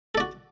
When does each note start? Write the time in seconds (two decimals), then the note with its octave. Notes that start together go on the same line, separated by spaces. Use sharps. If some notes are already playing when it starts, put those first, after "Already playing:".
0.15 A4
0.17 D5
0.20 F#4